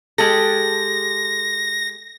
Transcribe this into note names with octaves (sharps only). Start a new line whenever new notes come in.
G#3 G4 A4 A#6